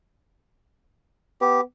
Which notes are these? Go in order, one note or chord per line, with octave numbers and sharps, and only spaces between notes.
B3 G4